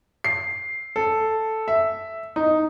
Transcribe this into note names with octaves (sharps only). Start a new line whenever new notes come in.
C7
A4
E5
D#4